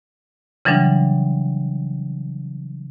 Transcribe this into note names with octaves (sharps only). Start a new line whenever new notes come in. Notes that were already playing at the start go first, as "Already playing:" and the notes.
C#3 E3 F#3 G3 D4